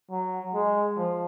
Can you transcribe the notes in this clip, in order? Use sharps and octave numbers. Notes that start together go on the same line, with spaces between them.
F#3
G#3
F3